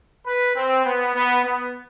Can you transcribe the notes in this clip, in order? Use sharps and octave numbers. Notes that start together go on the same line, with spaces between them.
B4
C4
B3
B3
B3